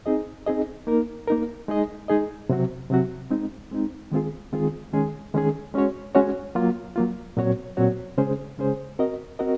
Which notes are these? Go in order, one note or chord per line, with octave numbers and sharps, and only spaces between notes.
C4 D#4 G#4 D#5
C4 D#4 G#4 D#5
A#3 D#4 A#4
A#3 D#4 A#4
G#3 D#4 G#4 D#5
G#3 D#4 G#4 D#5
C3 F#3 C4 F#4
C3 F#3 C4 F#4
G#3 C4 D#4
G#3 C4 D#4
D#3 G#3 C4 F4 G#4
D#3 G#3 C4 F4 G#4
D#3 G#3 C#4 G#4
D#3 G#3 C#4 G#4
G#3 C#4 F#4 C#5
G#3 C#4 F#4 C#5
F#3 A#3 F4
F#3 A#3 F4
A#2 F#3 C4 F#4 C#5
A#2 F#3 C4 F#4 C#5
C#3 G#3 C#4 G#4 C5
C#3 G#3 C#4 G#4 C5
C4 F#4 A#4 D#5
C4 F#4 A#4 D#5